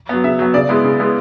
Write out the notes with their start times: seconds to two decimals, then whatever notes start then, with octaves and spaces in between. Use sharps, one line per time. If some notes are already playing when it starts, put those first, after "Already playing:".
0.09 F#3 B3
0.24 C#3 E5
0.39 F#3 B3
0.54 C#3 D5
0.69 G#3 B3 E4
0.84 C#3
0.99 G#3 B3 E4